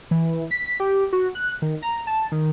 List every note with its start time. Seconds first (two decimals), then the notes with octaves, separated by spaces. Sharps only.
0.11 E3
0.51 B6
0.80 G4
1.13 F#4
1.35 F#6
1.62 D#3
1.82 A#5
2.07 A5
2.32 D#3